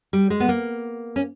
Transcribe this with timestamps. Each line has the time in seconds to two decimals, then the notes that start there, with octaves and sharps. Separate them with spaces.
0.13 G3
0.30 G#3
0.40 B3
0.49 A#3
1.16 C#4